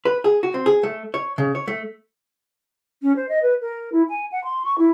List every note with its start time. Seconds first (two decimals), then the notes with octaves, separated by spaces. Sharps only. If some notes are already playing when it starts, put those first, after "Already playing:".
0.05 B4
0.24 G#4
0.43 F#4
0.54 C4
0.66 G#4
0.83 A3
1.14 C#5
1.38 C#3
1.55 C#5
1.68 A3
3.02 C#4
3.16 C5
3.29 D#5
3.42 B4
3.61 A#4
3.92 E4
4.09 G#5
4.32 F#5
4.44 C6
4.65 C#6
4.78 E4